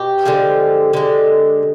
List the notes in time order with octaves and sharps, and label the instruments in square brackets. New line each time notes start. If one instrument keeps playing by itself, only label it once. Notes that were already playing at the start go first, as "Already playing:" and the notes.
Already playing: [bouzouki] B2 G4
D3 F3 G#3
D3 G#3